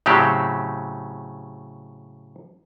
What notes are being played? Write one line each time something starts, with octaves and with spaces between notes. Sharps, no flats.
A2 C#3 F#3 C4 G4